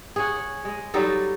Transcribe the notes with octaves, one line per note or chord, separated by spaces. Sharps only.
G#4 C#5 F#5
C#5
G#3
F#3 G3 D#4 A4